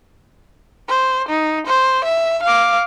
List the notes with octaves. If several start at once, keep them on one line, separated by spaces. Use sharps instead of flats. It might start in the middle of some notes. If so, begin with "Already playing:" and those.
C5
D#4
C5
E5
F5 D6